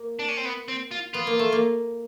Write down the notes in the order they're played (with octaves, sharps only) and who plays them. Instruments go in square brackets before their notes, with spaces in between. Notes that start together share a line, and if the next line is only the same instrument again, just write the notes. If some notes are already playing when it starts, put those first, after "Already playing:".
Already playing: [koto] A#3
[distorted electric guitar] D4
C#4
C4
B3
C4
F4
[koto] B3 [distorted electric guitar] F4
[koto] A#3
A3
A#3